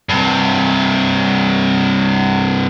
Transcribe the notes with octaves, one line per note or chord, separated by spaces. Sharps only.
G2 C3